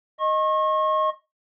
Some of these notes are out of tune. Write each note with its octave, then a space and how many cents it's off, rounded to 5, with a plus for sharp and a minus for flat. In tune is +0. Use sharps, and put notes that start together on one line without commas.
D#5 +0 C#6 -40